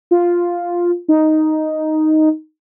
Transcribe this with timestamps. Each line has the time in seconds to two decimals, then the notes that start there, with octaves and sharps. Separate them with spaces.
0.11 F4
1.08 D#4